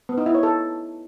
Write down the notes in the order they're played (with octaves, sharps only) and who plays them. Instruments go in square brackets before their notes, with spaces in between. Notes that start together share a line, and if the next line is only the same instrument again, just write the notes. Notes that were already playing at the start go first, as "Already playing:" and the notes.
[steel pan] B3
D#4
E4
C#5
A4